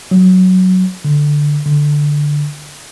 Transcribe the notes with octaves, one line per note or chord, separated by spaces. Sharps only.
F#3
D3
D3